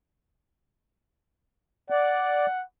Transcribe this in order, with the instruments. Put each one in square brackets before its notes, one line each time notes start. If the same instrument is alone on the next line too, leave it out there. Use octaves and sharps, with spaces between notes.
[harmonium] D5 [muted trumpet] F#5